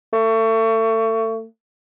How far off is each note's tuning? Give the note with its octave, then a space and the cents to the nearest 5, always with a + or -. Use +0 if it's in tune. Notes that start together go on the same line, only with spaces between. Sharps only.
A3 +30